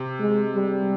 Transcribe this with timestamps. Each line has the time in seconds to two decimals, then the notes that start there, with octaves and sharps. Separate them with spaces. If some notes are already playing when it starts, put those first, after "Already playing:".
Already playing: C3
0.20 G#3
0.55 G3